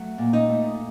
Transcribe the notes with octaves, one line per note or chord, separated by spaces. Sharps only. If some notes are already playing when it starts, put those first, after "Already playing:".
Already playing: F#3 A3
A#2
D#4
A3